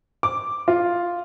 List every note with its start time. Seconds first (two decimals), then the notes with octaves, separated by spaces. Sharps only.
0.23 D6
0.68 F4